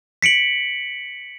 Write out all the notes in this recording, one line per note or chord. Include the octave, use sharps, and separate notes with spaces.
B6 C#7 D7 F#7